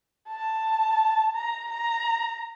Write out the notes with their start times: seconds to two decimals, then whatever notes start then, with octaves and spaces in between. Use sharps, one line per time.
0.28 A5
1.34 A#5
1.70 A#5